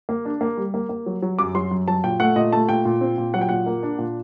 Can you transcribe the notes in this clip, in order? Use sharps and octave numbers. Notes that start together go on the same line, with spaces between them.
A#3
D4
A#3
G3
A#3
A#3
F#3
F#3
F#2 D6
F#3 C6
F#2
F#3 A5
A#2 G5
A3 F#5
A#2 D#5
A3 A5
A#2 G5
A#2
C4
A#2
F#3 F#5
G5
A#2 F#5
A#3
D4
A#2